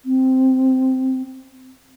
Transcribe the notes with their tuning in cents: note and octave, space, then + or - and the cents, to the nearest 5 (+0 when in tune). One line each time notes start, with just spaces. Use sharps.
C4 -5